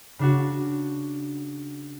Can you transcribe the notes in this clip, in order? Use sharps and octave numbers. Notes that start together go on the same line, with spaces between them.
C#3 D4 F#4